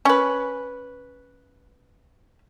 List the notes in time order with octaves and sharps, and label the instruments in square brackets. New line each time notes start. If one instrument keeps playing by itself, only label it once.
[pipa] C#4 B4